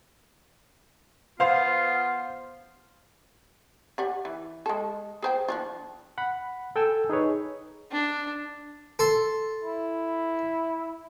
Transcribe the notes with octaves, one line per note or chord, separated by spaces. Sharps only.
B3 F4 C5 F5
G4 D5 F#5
E3
G#3 A4
G#4 C5 G5
F3 D4 F4
F#5 B5
A4 G5 G#5 E6
D#4 G#4 B4 C#5
D4
A4 C6
E4